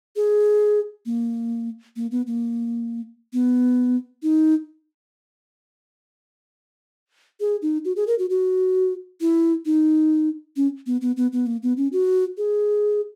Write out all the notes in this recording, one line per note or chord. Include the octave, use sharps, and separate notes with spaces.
G#4
A#3
A#3
B3
A#3
B3
D#4
G#4
D#4
F#4
G#4
A#4
F#4
F#4
E4
D#4
C#4
B3
B3
B3
B3
A#3
B3
C#4
F#4
G#4